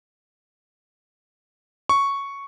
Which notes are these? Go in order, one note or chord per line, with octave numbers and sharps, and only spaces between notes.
C#6